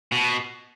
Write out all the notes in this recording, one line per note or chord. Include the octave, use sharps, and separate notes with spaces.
B2